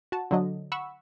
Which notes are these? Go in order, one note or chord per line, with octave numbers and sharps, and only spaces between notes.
F#4 A5
D3 F#3 D#5
F#5 B5 C#6 E6